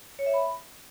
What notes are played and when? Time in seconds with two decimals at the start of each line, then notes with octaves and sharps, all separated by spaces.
0.19 C#5
0.26 E5
0.34 B5